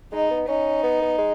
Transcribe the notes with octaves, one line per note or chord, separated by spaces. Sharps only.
G#3 D#4
B3
C#4 D#4
B3
B3
G#3